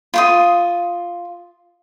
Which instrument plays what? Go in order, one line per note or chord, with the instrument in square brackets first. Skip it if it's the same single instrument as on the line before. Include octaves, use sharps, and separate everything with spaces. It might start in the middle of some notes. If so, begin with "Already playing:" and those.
[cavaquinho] F4 C6 D#6